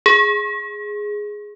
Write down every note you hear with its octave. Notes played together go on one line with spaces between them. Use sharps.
G#4